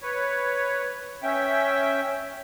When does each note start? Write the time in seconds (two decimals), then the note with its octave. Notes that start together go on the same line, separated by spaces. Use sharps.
0.02 B4 C#5
1.23 C#4 E5 G5